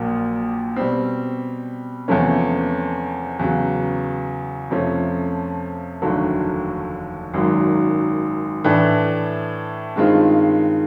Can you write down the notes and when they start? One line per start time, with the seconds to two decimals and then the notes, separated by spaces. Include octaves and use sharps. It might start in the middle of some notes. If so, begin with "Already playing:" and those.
Already playing: A#1 A#2 F#3 A#3
0.76 B2 G3 C4
2.08 E2 C3 F3 A3 C#4
3.39 E2 C#3 F#3
4.71 F2 C3 F3 A3 C#4
6.02 F1 D#2 D3 F#3 A3
7.34 G#1 F#2 D#3 F#3
8.64 A2 E3 A3 D4
9.96 G2 D#3 G#3 C4 F4